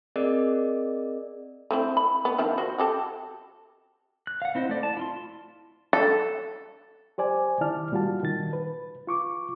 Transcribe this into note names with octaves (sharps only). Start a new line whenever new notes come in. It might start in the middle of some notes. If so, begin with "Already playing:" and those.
C4 G#4 A#4 D5 D#5
A3 C4 E4
B5
B3
D#3 F3 E4
F#4 C5
F#4 G4 A4
F#6
F5 F#5
C4 E4 C5 D#5
A3 D5
A5
E4 F4 C6
A4
G4 C5 D5 G#5
D#3 E4 D5 A5 F6
A#2 G3 F4 F#4 A5
D#3 A6
B4
F4 C#6 D6